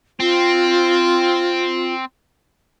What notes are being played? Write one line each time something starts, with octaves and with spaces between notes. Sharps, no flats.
C4 F4